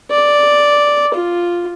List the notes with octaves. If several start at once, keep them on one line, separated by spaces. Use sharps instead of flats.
D5
F4